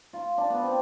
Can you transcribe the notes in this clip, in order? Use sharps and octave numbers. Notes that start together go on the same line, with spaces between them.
F4
D4
B3
C4